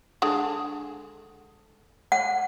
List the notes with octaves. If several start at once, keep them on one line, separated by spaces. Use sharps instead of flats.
D3 G#3 G#4
F#5